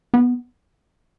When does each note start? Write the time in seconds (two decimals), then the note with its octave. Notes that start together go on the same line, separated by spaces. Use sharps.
0.14 B3